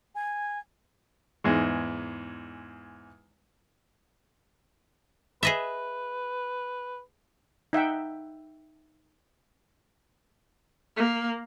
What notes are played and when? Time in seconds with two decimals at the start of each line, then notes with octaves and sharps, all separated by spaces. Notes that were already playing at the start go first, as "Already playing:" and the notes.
0.15 G#5
1.44 E2 G#2 G#3
5.43 G#4 B4 D#5 E5
7.73 D#4 E5 F#5 G5
10.97 A#3